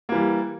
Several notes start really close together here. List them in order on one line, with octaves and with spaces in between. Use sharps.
A#3 E3 G3